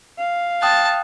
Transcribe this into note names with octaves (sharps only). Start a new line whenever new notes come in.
F5
G5 A5 D#6 F#6